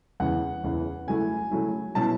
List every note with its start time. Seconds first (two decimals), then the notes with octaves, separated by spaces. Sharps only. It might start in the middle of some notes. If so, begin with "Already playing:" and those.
0.20 E2 C#3 E3 F#5
0.64 E2 C#3 E3
1.07 C#3 F#3 A3 E4 G#5
1.51 C#3 F#3 A3 E4
1.95 B2 F#3 C#4 E4 A5